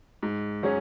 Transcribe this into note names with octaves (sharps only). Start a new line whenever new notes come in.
G#2
F#3 C#4 G#4 C#5